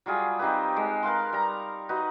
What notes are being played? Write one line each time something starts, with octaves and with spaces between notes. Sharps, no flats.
F#3 G3 F4 G#4
C4 D#4 G4 B4
G#3
A#4 B4 F5 C6
G3 A#5
D#4 F#4 B4